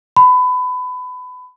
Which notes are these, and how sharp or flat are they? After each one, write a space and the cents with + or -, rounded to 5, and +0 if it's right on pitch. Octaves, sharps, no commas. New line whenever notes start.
B5 +25